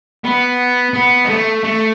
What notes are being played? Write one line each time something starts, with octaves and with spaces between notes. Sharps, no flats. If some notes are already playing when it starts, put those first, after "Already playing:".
B3
B3
G#3
A3
A3